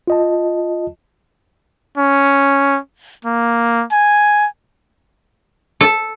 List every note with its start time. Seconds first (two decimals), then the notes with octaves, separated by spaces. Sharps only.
0.08 F4 D#5 A5
1.97 C#4
3.25 A#3
3.92 G#5
5.81 A4